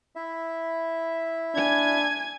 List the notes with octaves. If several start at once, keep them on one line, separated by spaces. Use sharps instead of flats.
E4 E5
D4 G#5 G#6